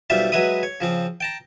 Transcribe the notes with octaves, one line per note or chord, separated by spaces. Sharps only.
B1 G3 A3 F4 C5 E5
F#3 G#3 B4 E5 B5 D#6
C#5
C#3 F3 C4
G5 A5 A#5